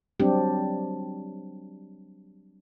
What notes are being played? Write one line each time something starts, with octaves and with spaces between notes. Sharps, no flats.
F#3 G3 C4 D4 G4